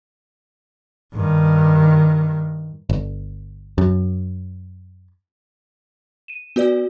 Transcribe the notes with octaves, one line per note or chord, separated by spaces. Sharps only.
G2 D#3
G1
F#2
D#7 E7
B3 F#4 B4 D5